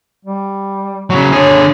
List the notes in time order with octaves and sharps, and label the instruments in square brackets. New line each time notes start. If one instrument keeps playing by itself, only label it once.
[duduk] G3
[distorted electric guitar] C#3 F#3
[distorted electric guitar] D3 G#4 [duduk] C#5